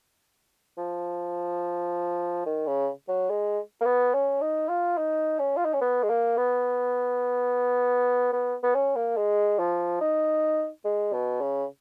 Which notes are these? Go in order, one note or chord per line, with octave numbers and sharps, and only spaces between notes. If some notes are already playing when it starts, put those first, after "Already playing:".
F3
D#3
C#3
F#3
G#3
A#3
B3
C#4
D#4
F4
D#4
C#4
F4
D#4
C#4
B3
G#3
A#3
B3
B3
B3
C#4
A#3
G#3
F3
D#4
G#3
B2
C#3